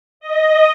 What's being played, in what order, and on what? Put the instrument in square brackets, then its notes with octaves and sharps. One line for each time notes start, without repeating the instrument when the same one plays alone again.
[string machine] D#5